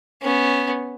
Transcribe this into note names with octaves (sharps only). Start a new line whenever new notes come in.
B3 C#4